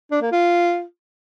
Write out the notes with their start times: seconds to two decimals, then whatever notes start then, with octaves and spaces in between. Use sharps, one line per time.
0.11 D4
0.21 A#3
0.31 F4